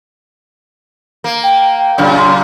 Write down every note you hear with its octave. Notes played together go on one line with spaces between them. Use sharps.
A#3
G5
F#2 A#2 C#3
C6